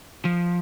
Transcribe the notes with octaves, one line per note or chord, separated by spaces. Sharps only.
F3